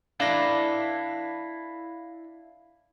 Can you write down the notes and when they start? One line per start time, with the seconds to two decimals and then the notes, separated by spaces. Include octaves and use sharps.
0.20 D4 E4 A4 B4 F5 A#6